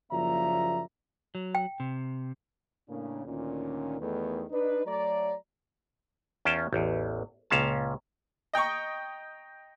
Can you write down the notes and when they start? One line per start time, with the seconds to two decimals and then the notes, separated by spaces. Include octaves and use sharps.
0.11 F#1 F3 A#3 D5 E5 A#5
1.35 F#3
1.55 G5
1.80 C3
2.89 A2 C#3 A#3 D4
3.26 D2 A#2 D#3 C#4
4.00 E2 D#3 A3 B3
4.50 D4 D#4 B4
4.86 F#3 A3 D5 A#5
6.45 E2 C#4 F4 G5 A5
6.73 A1 E2
7.50 C#2 A#2 C#4 F5 A5
8.53 D#5 G5 A#5 C#6